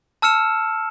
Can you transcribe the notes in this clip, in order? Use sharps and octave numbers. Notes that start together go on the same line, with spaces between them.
A5 E6 F6 C#7 E7